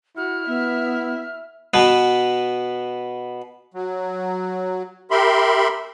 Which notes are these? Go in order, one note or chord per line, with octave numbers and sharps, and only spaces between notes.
E4 F#4 F6
B3 E5
B2 B3
F#3
G4 A#4 E5 B5 C6